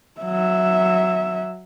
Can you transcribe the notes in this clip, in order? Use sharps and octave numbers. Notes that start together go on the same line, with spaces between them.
F#3 E5